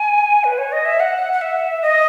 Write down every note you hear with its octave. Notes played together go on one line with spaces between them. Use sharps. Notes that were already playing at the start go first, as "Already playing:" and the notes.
Already playing: G#5
B4
C#5
D#5
E5
F#5
F#5
E5
D#5